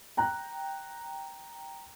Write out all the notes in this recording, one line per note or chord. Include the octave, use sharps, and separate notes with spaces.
G5 A#5 F#6